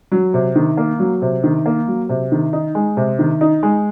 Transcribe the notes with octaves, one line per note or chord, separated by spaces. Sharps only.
F#3
C3
D#3
A#3
F#3
C3
D#3
A#3
F#3
C3
D#3
D#4
G#3
C3
D#3
D#4
G#3